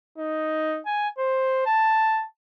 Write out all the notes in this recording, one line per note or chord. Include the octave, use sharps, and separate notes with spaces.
D#4
G#5
C5
A5